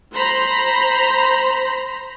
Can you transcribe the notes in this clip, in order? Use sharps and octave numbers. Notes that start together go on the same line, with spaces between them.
C5 A#5 B5